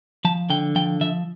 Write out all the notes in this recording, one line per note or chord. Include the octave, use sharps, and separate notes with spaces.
F3 A5
D3 G5
F3 G5
F3 E5